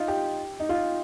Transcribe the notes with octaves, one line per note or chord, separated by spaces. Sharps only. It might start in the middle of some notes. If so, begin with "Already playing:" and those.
Already playing: D#4 F4
G4
D#4
F4